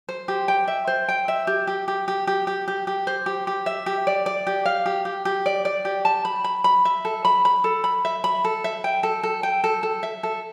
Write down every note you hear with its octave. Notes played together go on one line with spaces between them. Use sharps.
C5
G4
G5
E5
C5
G5
E5
G4
G4
G4
G4
G4
G4
G4
G4
C5
G4
G4
E5
G4
D5
D5
G4
F5
G4
G4
G4
D5
D5
G4
A5
B5
B5
B5
E5
A4
B5
B5
A4
B5
E5
B5
A4
E5
G5
A4
A4
G5
A4
A4
E5
A4